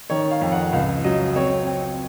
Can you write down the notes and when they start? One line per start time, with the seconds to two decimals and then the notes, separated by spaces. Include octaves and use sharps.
0.10 D#3 C#5
0.31 F5
0.41 F2
0.52 F#5
0.73 C#2 F5
1.04 F#3 D#5
1.35 C4 C#5
1.67 C4